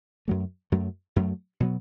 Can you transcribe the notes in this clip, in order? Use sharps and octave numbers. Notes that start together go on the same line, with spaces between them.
F#2 F#3 A3
F#2 F#3 A3
F#2 F#3 A3
B2 F#3 B3